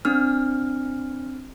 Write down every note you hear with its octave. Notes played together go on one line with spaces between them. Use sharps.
C4 D4 F6